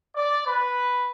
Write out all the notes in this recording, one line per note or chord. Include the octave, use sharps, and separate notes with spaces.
D5
B4